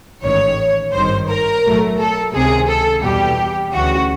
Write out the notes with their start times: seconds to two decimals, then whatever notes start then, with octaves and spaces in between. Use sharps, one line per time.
0.22 A1 G#2 D#3 C#5
0.93 G#1 G2 D#3 C5
1.28 A#4
1.64 B1 A2 F#3 A3
1.97 A4
2.34 C#2 C3 D#3 G#4
2.68 A4
3.03 E2 B2 G3 G4
3.74 D2 C#3 E3 F#4